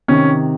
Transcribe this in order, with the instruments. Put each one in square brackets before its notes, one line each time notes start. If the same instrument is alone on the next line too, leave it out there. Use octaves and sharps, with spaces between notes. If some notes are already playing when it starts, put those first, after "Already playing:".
[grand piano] C3 D#3 C#4